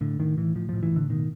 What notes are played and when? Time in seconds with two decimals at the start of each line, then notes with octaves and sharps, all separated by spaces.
0.01 A2 D3
0.19 A2 D#3
0.37 A2 E3
0.55 A2 F3
0.69 A2 F3
0.83 E3
0.92 A2 D3
1.09 B2 D#3